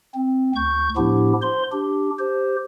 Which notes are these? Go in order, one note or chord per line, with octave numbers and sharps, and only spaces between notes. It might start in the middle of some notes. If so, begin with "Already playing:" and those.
C4
D2 C#6 G6
A2 F3 B3 D4 E4 G4
C5 C6
D4 G4
G4 C5